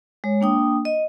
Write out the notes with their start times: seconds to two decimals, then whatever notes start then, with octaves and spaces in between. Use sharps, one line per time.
0.24 G#3 C#5
0.41 A#3 D4 G5 D#6
0.85 D#5